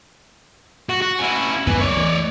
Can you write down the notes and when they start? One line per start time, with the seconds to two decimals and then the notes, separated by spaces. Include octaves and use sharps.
0.89 F#4
1.02 F#4
1.19 C#4 E4
1.67 C#2 F#2 B3 B4 G#5
1.80 C#5 D5
1.97 E3 A3